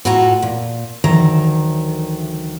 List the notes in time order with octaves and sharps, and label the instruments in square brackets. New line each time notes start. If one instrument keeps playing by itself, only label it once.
[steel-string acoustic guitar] A2 F4 F#4 A4 F#5 A#5
A#2
D2 D#3 E3 F#3 E5 A#5